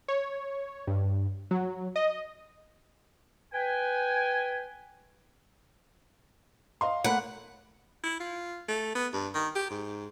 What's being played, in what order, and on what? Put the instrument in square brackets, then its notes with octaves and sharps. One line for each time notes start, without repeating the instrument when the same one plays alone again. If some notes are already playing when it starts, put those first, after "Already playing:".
[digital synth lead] C#5
G2
F#3
D#5
[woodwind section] B4 G5 G#5
[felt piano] D#5 F5 C6
[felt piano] A3 A#3 B5 [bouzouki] F#5
[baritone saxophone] E4
F4
A3
B3
G2
D#3
G4
G#2